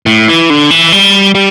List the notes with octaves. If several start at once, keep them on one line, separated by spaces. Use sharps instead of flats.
A2
E3
D3
E3
G3
G3